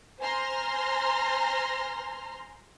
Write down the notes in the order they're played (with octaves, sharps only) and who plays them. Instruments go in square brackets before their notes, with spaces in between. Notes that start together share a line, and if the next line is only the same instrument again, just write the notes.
[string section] C5 G#5 A#5 C6 F6